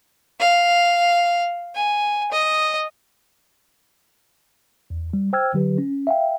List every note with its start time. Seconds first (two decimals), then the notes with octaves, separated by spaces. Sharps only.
0.40 F5
1.75 G#5
2.32 D#5
4.90 E2
5.13 G3
5.33 C5 G5 E6 F6 G#6
5.54 D3 F#3 G4 B4
5.78 C#4
6.07 E5 F5 G5